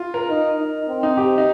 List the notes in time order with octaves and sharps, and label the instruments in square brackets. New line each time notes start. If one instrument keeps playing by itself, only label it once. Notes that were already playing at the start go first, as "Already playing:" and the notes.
Already playing: [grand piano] F4
A#4
[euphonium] D#4
D#4
C4
[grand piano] D#4
G4
D#4